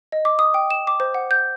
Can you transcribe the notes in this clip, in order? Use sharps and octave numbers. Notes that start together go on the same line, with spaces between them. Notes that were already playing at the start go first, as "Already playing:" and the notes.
D#5
D6
D#6
G5
E7
D6
C5
F#5
G6